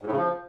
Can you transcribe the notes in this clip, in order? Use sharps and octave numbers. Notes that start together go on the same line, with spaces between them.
G#2
A2
C#3
F3